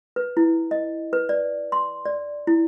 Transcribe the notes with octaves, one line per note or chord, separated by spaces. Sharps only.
B4
E4
D#5
B4
D5
C6
D5
E4